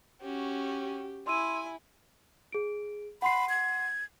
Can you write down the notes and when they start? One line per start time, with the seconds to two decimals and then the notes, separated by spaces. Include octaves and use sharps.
0.22 C#4 F#4 G4
1.27 E4 G#5 C6 E6 D#7
2.52 G#4 D7
3.22 F#5 B5 C6 C7
3.49 G#6